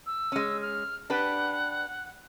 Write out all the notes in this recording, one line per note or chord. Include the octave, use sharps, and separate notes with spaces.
E6
G#3 C#4
F6
D4 G4 B4 F#5